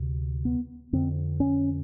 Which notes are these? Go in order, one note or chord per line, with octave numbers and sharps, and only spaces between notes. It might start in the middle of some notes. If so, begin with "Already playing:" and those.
Already playing: D2 C3
B3
F2 D3 C4
C#4